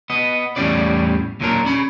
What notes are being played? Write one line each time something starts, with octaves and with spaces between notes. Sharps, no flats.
B3 D#5
E2 A2 G3 C#4 D5
D#2 A#2 F#3 D4 A#4
C#4 B5